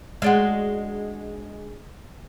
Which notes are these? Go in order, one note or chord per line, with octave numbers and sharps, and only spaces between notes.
G#3 D4 F#4